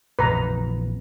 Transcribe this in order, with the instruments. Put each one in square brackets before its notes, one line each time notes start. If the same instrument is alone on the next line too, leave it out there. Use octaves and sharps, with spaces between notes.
[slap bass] A#1 F2 E3 [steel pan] B4 A#5